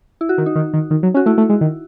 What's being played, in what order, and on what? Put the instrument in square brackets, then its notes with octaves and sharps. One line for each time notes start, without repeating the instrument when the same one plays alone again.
[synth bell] E4
F#4
[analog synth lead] D#3
[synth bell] D#4
[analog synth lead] D#3
D#3
D#3
F#3
[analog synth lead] C#4 [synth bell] F#4
[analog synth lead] A3 [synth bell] E4
[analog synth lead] A3
G#3
D#3